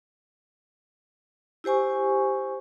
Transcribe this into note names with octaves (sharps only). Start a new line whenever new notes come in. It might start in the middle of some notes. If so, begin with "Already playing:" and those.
E4 G4 C5 G#5 C#6